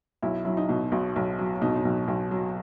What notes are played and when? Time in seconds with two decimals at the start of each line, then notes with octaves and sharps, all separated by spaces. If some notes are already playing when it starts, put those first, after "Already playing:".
0.22 B1 E4
0.45 F#3 E4
0.57 D#4
0.69 B2
0.92 B1
1.16 B1
1.39 F#3
1.62 B2 D#4
1.76 D#4
1.85 B1
2.08 B1
2.31 F#3